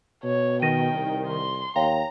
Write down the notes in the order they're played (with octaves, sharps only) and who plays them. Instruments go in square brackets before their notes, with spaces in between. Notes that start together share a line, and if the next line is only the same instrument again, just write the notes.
[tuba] B2 [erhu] C#5
[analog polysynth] D#3 [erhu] G5 [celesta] A#6 D#7
[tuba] C2
[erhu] C6
[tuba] D#2 [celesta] C#5 F5 G5 [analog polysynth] A#5